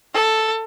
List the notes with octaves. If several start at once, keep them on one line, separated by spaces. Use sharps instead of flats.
A4